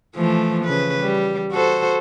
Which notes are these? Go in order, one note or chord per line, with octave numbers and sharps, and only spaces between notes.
E3 F3 A3
C#3 B4
G3
F#4 A4 C5